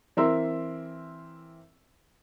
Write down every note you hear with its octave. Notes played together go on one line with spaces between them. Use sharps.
E3 C4 A#4 E5 C6 E6